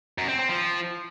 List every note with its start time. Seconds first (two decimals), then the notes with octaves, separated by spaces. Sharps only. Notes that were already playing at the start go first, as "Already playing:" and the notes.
0.18 F#2
0.29 C4
0.39 C4
0.49 F3